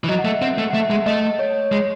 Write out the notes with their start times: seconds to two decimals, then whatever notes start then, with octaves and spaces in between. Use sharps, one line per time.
0.04 E3
0.08 F#3 D#5
0.19 F#5
0.25 A3 E5
0.42 C4 F#5
0.58 A3
0.70 F#5
0.73 A3 E5
0.90 G#3
1.06 A3 D#5
1.39 C#5
1.72 G#3